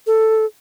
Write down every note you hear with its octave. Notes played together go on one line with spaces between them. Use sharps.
A4